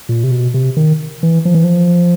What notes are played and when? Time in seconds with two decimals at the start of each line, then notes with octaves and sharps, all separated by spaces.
0.09 A#2
0.24 C3
0.31 B2
0.54 C3
0.77 D#3
1.23 E3
1.45 F3
1.55 E3
1.64 F3